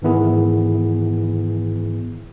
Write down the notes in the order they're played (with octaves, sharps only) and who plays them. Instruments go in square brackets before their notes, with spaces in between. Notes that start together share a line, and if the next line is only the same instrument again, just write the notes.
[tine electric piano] G#2 D#3 E3 B3 E4 G#4